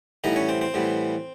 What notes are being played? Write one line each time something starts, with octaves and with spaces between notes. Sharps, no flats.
A2 E3 G3 B3 D#4 D#5
C#4 C#5
C4 C5
C4 C5
A2 E3 G3 B3